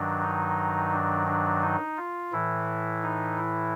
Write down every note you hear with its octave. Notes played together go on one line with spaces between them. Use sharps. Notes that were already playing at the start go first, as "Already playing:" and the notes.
Already playing: G2 D#3 F#3 D4
D#4
D4
D4
D#4
F4
A2 E3 E4
D#4
E4